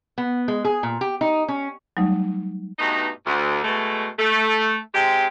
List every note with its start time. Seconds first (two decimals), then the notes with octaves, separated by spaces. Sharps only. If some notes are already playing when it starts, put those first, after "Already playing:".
0.18 B3
0.48 G#3
0.65 G#4
0.83 A#2
1.01 G4
1.21 D#4
1.48 C#4
1.97 F#3 G3 A3 D#4
2.78 G2 B2 A3 D#4
3.26 D2
3.64 B2 G#3 A3
4.19 A3
4.94 C3 G#3 C4 G4